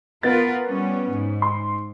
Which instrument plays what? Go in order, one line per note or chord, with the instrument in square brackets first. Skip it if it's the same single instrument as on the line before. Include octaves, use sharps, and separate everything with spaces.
[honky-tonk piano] B3 A6 [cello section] F4 A#4 B4
[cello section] G3 C#4
G#2
[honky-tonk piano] C6